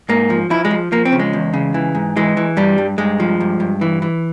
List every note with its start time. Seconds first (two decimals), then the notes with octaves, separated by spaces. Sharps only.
0.09 G#2 A#3
0.30 F3
0.50 F3 E4
0.65 G#3
0.71 F3
0.92 F3 A#3
1.05 C4
1.12 C#3
1.20 G#3
1.33 E2
1.54 C#3
1.74 E3
1.95 G#2
2.16 E3 G#3
2.37 E3
2.57 G2 G3
2.78 G2
2.98 G2 G#3
3.20 F3
3.41 G2
3.60 G2
3.81 E3
4.02 E3